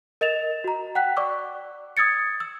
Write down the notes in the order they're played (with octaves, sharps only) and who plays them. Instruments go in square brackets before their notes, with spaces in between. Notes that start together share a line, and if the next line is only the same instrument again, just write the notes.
[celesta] A#4 D#5 A6 E7 F7
F#4 A#5
F#5 G5 F#6 B6
D5 C#6 D6 E6
D#6 E6 G#6 A6 C#7
E6